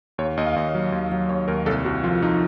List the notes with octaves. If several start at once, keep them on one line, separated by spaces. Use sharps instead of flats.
D#2 C#5
D#2 D#5
F5
D#2 D#5
F#3
D#2
F#3
D#2 C#5
D#2 A#4
C2 A4
C2 F#4
F3 F4
F3 D#4